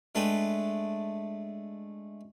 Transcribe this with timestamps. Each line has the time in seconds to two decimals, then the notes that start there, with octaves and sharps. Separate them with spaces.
0.15 G#3 A3 D4 A4 B4 G5